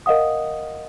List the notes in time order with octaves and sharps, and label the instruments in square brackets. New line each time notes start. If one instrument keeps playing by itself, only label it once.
[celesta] A#4 D#5 F5 F#5 D#6